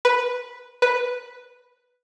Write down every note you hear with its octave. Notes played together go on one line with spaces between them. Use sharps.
B4
B4